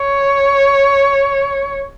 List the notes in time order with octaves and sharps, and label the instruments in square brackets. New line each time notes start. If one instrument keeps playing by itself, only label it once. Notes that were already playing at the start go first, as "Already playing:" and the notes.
Already playing: [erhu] C#5